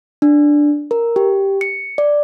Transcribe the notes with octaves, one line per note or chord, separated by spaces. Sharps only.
D4
A#4
G4
C#7
D5